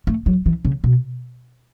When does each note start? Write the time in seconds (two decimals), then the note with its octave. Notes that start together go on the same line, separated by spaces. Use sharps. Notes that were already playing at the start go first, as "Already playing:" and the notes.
0.07 A3
0.26 F#3
0.46 E3
0.65 C#3
0.84 B2